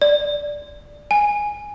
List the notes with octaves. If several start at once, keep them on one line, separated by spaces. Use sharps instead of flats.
D5
G#5